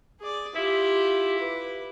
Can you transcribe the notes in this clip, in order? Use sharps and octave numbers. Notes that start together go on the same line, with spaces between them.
G#4 D5
E4 F4 G4
B4